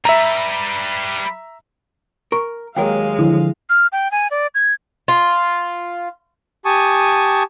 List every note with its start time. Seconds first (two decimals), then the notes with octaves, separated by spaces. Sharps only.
0.05 G3 B4 E5 A#5
2.32 A#4 C#6
2.76 D#2 F#3 G#3 A#4 C#5 F5 G5
3.19 D3 F3 E4
3.70 F6
3.92 G5
4.12 G#5
4.31 D5
4.55 G#6
5.08 F4
6.65 G4 G#5 A5 C#6 D#6